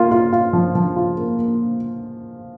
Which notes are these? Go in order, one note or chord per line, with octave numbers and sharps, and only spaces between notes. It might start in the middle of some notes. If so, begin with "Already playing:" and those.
Already playing: A#3 F4
F4
F4
F3
F3
F4
A#3
A#3